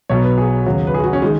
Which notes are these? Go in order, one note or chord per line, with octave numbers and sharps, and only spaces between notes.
B1 B2 F#3 C#5
B4
G#4
D#2 C#3 F#3
B4
G#4
F#4
C#4
D#3 G#3